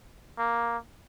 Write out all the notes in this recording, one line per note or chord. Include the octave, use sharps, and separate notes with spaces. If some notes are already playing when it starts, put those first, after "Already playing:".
A#3